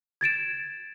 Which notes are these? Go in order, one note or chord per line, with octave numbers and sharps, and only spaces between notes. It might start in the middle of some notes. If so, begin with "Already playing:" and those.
G#6 A6 D7 E7